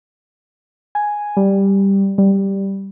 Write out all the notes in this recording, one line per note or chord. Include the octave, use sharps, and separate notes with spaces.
G#5
G3
G3